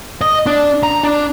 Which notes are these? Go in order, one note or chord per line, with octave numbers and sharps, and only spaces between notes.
D#5
D4
A#5
D4